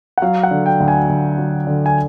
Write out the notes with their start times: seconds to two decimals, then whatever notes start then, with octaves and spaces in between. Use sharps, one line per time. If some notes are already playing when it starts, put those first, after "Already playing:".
0.18 F#5
0.22 F#3 F5
0.43 F#5
0.51 D3
0.66 G5
0.80 D2
0.88 G#5
1.09 D2
1.38 F#3
1.67 D3
1.86 G#5